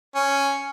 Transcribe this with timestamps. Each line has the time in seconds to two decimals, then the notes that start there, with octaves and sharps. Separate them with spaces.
0.15 C#4